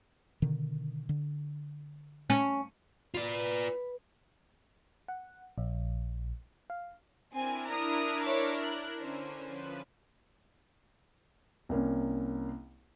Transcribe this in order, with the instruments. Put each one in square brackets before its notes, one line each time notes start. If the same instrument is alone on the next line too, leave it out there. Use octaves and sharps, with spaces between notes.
[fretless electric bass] B2 D3 D#3
D3
[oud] C#4
[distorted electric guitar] F4 D5 [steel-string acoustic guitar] B4
[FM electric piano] F#5
A#1
F5
[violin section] C4 G#5 [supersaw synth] D4 E4 A#4
[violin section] A#5 D#6
C#5 E5 D6
F#6
[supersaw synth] D3 [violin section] C#4 C5
[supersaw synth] F3 B4
[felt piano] C2 A#3 C#4